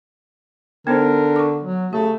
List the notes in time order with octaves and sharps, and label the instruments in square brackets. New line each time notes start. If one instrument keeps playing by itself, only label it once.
[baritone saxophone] D3 [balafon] B3 D#4 C5 [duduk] A#4
[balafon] C#6 D6
[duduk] F#3
[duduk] C#3 [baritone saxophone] A3 [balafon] G4